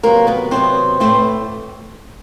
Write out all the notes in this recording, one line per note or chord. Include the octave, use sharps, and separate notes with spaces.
C3 D#3 F#3 A#3 B3 A#4
B3 B4
C3 D#3 F#3 B3 C4 C5
A2 E3 A3 C4 C5